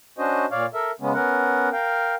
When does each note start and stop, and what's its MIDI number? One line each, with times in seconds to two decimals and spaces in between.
0.18 0.46 61
0.18 0.46 62
0.18 0.46 66
0.18 0.46 72
0.18 0.46 75
0.52 0.66 46
0.52 0.66 73
0.52 0.66 74
0.52 0.66 77
0.74 0.91 69
0.74 0.91 70
0.74 0.91 76
1.00 1.13 49
1.00 1.13 56
1.00 1.13 59
1.00 1.13 61
1.14 1.69 59
1.14 1.69 61
1.14 1.69 70
1.14 1.69 78
1.72 2.15 70
1.72 2.15 77
1.72 2.15 79